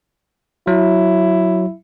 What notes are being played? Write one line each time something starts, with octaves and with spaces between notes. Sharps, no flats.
F#3 E4